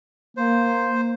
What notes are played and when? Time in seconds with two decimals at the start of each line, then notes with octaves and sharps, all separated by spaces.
0.37 A#3 C5